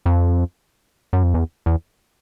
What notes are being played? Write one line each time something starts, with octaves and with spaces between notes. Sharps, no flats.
F2
F#2
F2
E2
E2